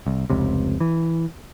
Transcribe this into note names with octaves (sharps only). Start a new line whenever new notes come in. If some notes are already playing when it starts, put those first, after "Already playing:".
C2
F1 C#2 C3
E3